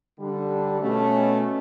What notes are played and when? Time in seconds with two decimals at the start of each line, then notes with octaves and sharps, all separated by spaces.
0.18 D3 G3 D4
0.81 B2 A3 C#4